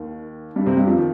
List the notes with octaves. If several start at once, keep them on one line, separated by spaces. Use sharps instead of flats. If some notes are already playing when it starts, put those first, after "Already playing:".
Already playing: D#2 D#3
G2 G3
C3 C4
G2 G3
F2 F3
D#3